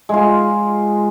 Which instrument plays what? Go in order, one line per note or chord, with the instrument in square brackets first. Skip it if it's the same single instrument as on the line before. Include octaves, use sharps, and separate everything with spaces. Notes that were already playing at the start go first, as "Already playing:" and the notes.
[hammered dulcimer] G#3 F4